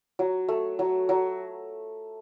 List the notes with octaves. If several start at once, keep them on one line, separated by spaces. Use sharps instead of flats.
F#3
A3
F#3
F#3